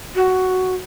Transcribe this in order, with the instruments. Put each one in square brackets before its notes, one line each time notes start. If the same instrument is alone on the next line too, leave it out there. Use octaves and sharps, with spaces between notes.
[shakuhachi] F#4